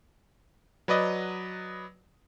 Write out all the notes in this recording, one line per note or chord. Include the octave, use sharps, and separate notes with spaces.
F#3 B4 D5 D#5